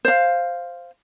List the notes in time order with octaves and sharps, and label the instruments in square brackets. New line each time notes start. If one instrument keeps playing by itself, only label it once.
[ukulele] C5 F5